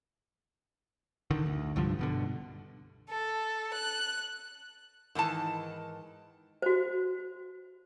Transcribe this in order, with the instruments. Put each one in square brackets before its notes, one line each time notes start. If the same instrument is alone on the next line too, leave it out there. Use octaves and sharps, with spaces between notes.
[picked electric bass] D3 D#3
D2
C2 G2 D3 F3
G2 B2 D3
[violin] A4
F#6
[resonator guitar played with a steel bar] G#2 D#3 E3 A5
[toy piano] F#4 C5